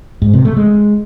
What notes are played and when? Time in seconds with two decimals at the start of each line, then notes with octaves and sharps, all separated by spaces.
0.22 G#2
0.33 C3
0.45 A3
0.57 G#3